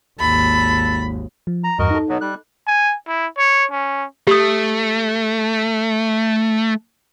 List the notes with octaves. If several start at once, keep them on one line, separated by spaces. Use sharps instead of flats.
G#1 D#2 A4 B5
F3
A#5
E2 G2 F#4 A#4 D#5
D#4 A4
B2 F#3 B3
G3 F#6
G#5
E4
C#5
C#4
A3 G4 D#6